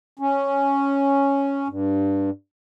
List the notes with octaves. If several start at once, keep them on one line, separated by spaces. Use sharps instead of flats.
C#4
G2